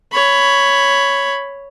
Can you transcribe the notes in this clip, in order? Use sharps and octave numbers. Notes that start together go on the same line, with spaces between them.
C#5 B5